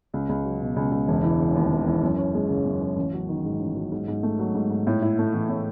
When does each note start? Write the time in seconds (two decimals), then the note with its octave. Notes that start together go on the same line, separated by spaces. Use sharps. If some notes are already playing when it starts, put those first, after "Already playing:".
0.14 C#2
0.29 C#2
0.45 F#3
0.61 B2
0.76 C#2
0.92 C#2
1.08 E1
1.24 E3
1.39 C#3
1.55 D#2
1.71 E1
1.87 E3
2.03 F#2
2.18 C#4
2.35 G#3
2.49 C#3
2.66 F#2
2.81 C#4
2.97 A1
3.13 F#3
3.29 D#3
3.45 G#2
3.60 A1
3.76 F#3
3.92 G#2
4.08 G#2
4.23 A3
4.39 F#3
4.55 G#2
4.70 G#2
4.87 A2
5.02 E4
5.19 A3
5.34 E3
5.49 A2